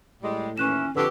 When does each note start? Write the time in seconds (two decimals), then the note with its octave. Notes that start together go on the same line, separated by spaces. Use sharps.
0.22 A2 G3 G#3
0.58 D#2 E3 C#4 C#6 F#6 E7
0.96 F2 D3 F#4 G4 B4 E6